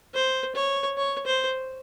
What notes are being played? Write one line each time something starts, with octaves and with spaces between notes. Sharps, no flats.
C5
C#5
C#5
C5